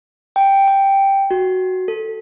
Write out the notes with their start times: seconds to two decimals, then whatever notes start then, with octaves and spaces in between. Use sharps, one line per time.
0.36 G5
0.68 G5
1.31 F#4
1.88 A4